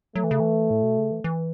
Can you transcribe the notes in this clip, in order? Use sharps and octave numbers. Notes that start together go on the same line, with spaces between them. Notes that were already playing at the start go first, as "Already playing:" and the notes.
F#3 A3
E3
C#3
E3
A2
B2
C#3
E3
E3